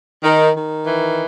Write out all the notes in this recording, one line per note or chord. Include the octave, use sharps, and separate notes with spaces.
D#3
D#3
E3